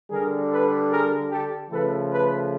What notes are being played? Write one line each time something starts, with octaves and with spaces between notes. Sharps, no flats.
D3 G3 G#4 A#4
A4 B4
G#4 A#4
G4 A4
C#3 F3 A3 A4 B4
A4 B4